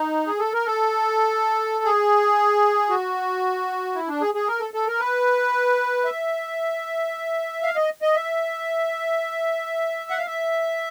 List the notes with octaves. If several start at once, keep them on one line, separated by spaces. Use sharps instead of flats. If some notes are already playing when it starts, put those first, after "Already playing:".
Already playing: D#4
G#4
A4
A#4
A4
G#4
F#4
E4
D4
G#4
G#4
A#4
A4
A4
A#4
B4
E5
F5
D#5
D#5
E5
F#5
F5
E5